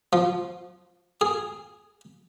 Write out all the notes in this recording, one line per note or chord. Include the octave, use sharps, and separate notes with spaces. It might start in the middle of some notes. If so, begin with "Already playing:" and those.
F3
G#4